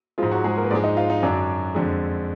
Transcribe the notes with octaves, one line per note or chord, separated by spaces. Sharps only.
G#2 F3 G#3 F4
F#3 F#4
G#3 G#4
A#3 A#4
B4
G#2 F3 G#3 D4 D5
D#4 D#5
F4 F5
D#4 D#5
F#2 D3 F#3 D4 D5
F2 D3 G#3